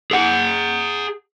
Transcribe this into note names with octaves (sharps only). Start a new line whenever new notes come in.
G#4 F#5